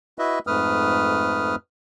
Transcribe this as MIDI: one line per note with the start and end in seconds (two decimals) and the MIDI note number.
0.19 0.39 64
0.19 0.39 66
0.19 0.39 71
0.19 0.39 75
0.19 0.39 76
0.47 1.55 41
0.47 1.55 44
0.47 1.55 57
0.47 1.55 71
0.47 1.55 87
0.47 1.55 89